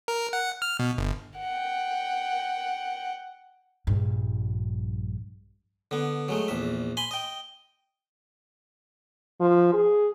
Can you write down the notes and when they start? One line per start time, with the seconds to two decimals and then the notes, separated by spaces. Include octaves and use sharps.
0.08 A#4
0.33 F#5
0.62 F6
0.79 B2
0.98 G1
1.37 F#5 G5
3.87 A#1 G2
5.91 D3 B3
6.28 F#3 G#3 A3
6.48 A#1 E2 E5
6.97 G#5 B5 C6
7.11 D#5 G5
9.40 F3
9.73 G#4